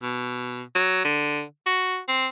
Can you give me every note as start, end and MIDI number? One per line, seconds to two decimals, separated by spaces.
0.03 0.62 47
0.75 1.02 54
1.04 1.42 50
1.66 1.99 66
2.08 2.27 60